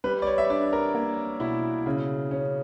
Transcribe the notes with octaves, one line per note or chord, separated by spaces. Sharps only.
G3 B4
D5
C#5
E5
D4 D5
A#4
A#3
B2 E4
C#3
C#4